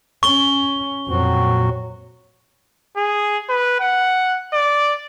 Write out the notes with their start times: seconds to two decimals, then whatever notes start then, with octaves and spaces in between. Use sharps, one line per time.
0.23 C#4 C#6 G7
1.07 F2 A#2 F#3 C4 F#4
2.97 G#4
3.49 B4
3.80 F#5
4.54 D5